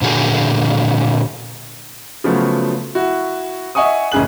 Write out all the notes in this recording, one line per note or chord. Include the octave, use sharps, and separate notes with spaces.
A#2 D3 F#4 G#4
C#3 F3 F#3 A3 B3
E4 F#4
D#5 E5 F#5 G#5 C#6 D#6
A1 F#2 C#3 G#4 F#6 F#7